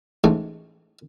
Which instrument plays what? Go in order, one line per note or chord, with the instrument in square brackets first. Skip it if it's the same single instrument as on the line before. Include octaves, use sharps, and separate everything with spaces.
[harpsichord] A1 G#2 E3 G#3 A3